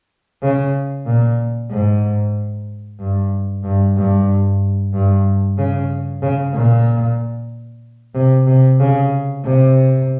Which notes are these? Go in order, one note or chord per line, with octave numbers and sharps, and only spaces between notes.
C#3
A#2
G#2
G2
G2
G2
G2
C#3
C#3
A#2
C3
C3
C#3
C3